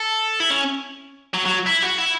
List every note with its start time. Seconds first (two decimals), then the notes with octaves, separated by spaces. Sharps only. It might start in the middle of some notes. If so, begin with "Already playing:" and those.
Already playing: A4
0.40 E4
0.50 C#4
1.34 F#3
1.46 F#3
1.66 E4
1.82 F#4
1.98 E4